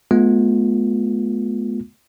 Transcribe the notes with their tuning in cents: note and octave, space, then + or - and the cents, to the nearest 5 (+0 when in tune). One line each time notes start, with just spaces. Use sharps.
G#3 +45 B3 -20 F4 +20